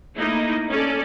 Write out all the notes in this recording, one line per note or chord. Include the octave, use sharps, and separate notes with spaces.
A3 A#3 D#4 E4
C#4 A4 D5